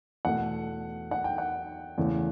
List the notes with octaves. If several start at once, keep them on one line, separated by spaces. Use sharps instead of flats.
E2 B2 A3 F#5
F#5
G5
F#5
E2 C#3 E3 A3 C#4